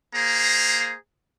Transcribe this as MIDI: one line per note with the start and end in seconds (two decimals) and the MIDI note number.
0.13 0.95 58
0.13 0.95 68
0.13 0.95 72
0.13 0.95 82